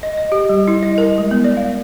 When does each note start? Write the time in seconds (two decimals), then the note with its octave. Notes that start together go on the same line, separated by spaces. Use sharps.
0.03 D#5
0.18 D#5
0.32 G4
0.49 G3
0.68 E4
0.83 D#5
0.98 A#4
1.18 G#3
1.31 B3
1.44 D5
1.57 F5